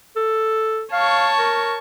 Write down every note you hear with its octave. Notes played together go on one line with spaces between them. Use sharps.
A4
C#5 F5 A5 C#6
A#4